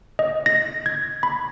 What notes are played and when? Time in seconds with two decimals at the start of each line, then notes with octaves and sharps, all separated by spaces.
0.19 D#5
0.46 A#6
0.86 G#6
1.23 B5